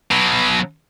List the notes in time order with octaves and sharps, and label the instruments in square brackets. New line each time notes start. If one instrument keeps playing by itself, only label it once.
[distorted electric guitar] B2 F#3